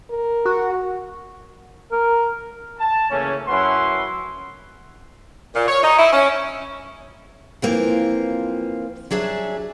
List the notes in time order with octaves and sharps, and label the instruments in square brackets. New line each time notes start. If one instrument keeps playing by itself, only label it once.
[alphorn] A#4
[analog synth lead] F#4
[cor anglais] A#4
[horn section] A5
C#3 E3 A3 A#3 C#4
F#2 C#4 E4 B4 F#5 C6
[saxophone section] A#2
C#5
D#4
E4
C#4
[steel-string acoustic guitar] E3 F3 A#3 C4 F4
F#3 D4 G#4 E5